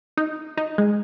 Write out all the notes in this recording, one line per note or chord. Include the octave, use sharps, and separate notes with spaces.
D#4
D#4
G#3